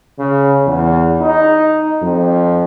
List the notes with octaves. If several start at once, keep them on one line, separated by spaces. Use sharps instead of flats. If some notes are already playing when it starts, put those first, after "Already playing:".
C#3
E2
D#4
F2